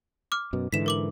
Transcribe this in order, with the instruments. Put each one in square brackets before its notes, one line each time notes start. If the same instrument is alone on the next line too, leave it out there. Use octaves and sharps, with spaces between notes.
[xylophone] D6 F6
[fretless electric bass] F#2 B2
[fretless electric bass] G#2 D3 E3 [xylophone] B6 E7
[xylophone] A#4 D6 F#7